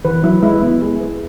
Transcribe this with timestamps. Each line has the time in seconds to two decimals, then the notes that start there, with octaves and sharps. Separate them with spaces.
0.05 E3 B4
0.23 F#3 E4
0.43 G#3 E4
0.61 B3 E4
0.82 G#4
1.00 B4